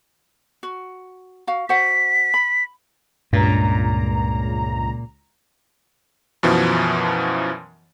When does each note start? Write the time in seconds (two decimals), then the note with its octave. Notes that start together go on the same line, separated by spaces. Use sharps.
0.63 F#4
1.47 F#4 F5
1.69 F#4 C5 F#5 B6
2.34 B5
3.33 C#2 G2 A#2 A#5
6.43 F#2 B2 E3 F3